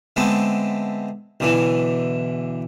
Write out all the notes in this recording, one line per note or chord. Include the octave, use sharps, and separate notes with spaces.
D3 G#3 A3 B3 C4
B1 D3 E3